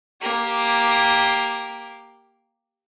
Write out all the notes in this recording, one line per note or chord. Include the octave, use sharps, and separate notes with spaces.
A#3 G4